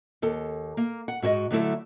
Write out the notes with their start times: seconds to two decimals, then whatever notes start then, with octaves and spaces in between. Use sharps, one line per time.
0.22 D#2 A4
0.77 A#3
1.08 F#5
1.22 G#2 F#4 C#5 D#5
1.50 D3 F#3 A3 E4 A4